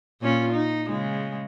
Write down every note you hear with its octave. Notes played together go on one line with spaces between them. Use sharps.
A#2 C#4 F4
D#4
C#3 G#3